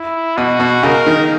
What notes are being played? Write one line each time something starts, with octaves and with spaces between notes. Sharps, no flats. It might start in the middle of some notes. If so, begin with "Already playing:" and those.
Already playing: E4
B2 F#4
B2
C#3 A#4
D#3